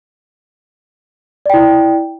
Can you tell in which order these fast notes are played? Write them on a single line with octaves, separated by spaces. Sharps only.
D5 G5 E4